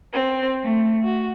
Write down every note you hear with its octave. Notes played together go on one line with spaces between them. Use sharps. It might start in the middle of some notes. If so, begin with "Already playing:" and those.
C4
A3
F#4